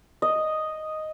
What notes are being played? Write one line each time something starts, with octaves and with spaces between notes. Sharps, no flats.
D#5